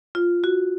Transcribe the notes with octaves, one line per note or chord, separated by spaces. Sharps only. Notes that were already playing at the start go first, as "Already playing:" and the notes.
F4
F#4